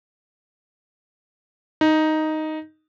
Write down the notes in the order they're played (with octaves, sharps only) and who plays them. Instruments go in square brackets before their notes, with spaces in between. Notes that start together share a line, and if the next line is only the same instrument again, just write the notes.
[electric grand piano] D#4